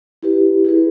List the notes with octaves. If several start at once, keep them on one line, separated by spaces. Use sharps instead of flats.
E4 G4 B4
E4 G#4 B4